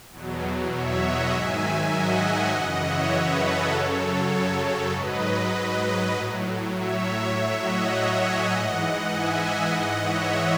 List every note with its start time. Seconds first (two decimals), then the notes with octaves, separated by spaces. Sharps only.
0.11 E2 B2 F#3
0.71 C#5 E5
1.01 D#5 F#5
1.31 G#2 D#3 F#3 E5 G#5
1.91 D#5 F#5
2.21 E5 G#5
2.51 F#2 C#3 E3 D#5 F#5
2.81 C#5 E5
3.12 B4 D#5
3.41 A4 C#5
3.72 F#2 C#3 F#3
4.92 G#2 F#3 B4 D#5
6.12 A2 F#3
6.72 C#5 E5
7.02 C#5 E5
7.32 A2 F#3 C#5 E5
7.62 D#5 F#5
7.92 C#5 E5
8.22 E5 G#5
8.51 G#2 E3 D#5 F#5
8.81 D#5 F#5
9.12 E5 G#5
9.72 G#2 E3 D#5 F#5
10.02 C#5 E5